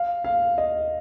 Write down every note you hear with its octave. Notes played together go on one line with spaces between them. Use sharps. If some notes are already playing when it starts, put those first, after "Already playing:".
Already playing: F5
F5
D#5